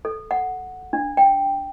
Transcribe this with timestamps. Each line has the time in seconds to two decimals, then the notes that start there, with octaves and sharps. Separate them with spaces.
0.05 A4
0.31 F#5
0.93 D4
1.17 G5